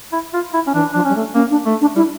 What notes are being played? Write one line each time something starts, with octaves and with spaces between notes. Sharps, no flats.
E4
F4
E4
C#4
E3 D4
F3 D4
G3 C#4
A3
A#3 C#4
D4
A3
D4
G3 E4